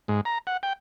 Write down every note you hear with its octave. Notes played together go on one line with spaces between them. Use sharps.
G#2
A#5
F#5
G5